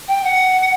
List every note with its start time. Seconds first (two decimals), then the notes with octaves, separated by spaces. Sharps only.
0.08 G5
0.24 F#5